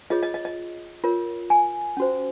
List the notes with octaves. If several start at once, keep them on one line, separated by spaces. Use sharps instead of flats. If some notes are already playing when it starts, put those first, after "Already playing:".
F4 G#4 C#5 D#5
D#5
D#5
D#5
F4 A#4 C#5
G#5
C#4 F#4 C5